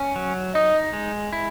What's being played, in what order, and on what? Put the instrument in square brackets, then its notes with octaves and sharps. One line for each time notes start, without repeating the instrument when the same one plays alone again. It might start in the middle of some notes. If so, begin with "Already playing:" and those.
Already playing: [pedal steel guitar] C#4
F#3
[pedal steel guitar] D#4 [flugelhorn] D#5
[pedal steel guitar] G#3
E4